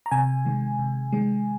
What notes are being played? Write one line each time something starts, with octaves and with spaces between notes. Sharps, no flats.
A#5
C3 G#5
D#3 G#3
C3
D#3 G#3